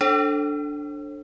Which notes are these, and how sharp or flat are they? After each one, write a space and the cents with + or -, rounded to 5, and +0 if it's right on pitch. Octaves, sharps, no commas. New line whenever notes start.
D4 +0 A4 +0 C5 +45